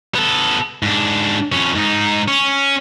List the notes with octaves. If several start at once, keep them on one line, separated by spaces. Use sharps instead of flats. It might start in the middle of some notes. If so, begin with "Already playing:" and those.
B3 A4
G#2 D4
F2 C#4
G#2 D#4
C#4